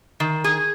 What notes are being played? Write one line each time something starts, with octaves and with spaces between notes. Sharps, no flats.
D#3
G#4